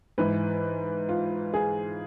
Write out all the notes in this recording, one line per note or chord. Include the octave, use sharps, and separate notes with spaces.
G#2 E3 B4
F4
G#4